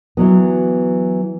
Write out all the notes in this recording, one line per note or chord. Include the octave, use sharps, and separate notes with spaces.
E3 F#3 B3